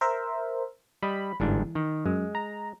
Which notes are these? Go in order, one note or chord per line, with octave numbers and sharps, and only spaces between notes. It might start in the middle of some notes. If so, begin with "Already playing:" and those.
A#4 C5 E5
G3 D#5 B5
G1 G#2 E3 D4
D#3
F#2 G#3
A#5